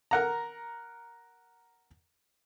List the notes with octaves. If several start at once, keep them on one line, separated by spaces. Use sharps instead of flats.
A#4 F#5 A#5